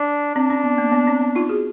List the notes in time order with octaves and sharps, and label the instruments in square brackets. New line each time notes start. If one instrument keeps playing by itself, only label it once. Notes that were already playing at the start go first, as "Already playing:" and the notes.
Already playing: [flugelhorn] D4
[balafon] C4 [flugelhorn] D4
[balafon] C#4
B3
A#3
B3
C4
B3
D#4 F4
F#4 G#4